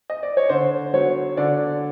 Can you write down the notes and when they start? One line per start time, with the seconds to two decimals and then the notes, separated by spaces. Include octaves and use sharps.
0.10 D#5
0.23 D5
0.37 C#5
0.49 D3 C5
0.93 F#3 B3 C#5
1.37 D3 D5